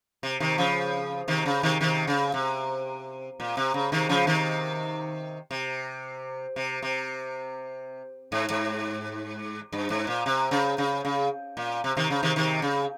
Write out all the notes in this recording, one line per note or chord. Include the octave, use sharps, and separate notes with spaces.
C3
C3 D#3
C#3 F3
C3 D#3
C#3
C3 D#3
C3 D#3
C#3
C3
A#2
C3
C#3
C3 D#3
C#3 F3
C3 D#3
C3
C3
C3
G#2
G#2
G2
G#2
A#2
C3
C#3
C#3
C#3
A#2
C3
C3 D#3
C#3
C3 D#3
C3 D#3
C#3